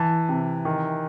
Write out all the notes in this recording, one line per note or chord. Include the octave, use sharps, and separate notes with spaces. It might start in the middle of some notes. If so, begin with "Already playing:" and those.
Already playing: E3 A5
C3
D#3